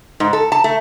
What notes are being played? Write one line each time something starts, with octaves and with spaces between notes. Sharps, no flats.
G#2
A4
A5
A3